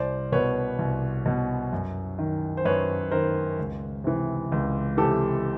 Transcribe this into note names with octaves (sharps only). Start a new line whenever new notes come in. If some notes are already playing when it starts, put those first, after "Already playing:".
Already playing: C2 C5 D5
B2 B4 C#5
C2
B2
F#2
D#3
C5
F#2 B4 C#5
D#3 A#4 C5
C#2
C3 E3
C#2
C3 E3 G4 A4